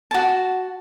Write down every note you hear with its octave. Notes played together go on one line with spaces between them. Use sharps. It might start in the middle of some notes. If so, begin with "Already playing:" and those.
F#4 A5